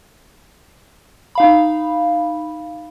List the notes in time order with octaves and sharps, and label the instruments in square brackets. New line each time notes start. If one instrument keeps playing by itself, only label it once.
[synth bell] D#4 F5 B5